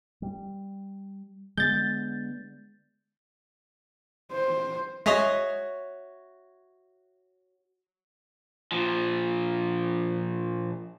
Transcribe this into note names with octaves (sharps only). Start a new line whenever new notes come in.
G3
D3 G#3 B3 G6 A6
C5
G#3 F#4 G#4 C#5 D#5 E5 B6 F7
A#2 F3